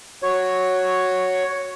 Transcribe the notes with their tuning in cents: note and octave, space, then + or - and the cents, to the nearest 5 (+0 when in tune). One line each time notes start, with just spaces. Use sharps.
F#4 +0 C#5 +0